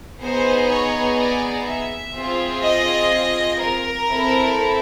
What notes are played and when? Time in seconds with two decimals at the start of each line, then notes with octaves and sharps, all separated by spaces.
0.22 B3 D#4 G#4 C5
0.71 C#5
1.19 D5
1.67 E5
2.15 C4 F4 G#4
2.63 D#5
3.61 A#4
4.09 C4 E4 A4